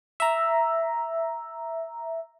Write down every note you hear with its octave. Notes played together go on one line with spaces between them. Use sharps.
E5 A#5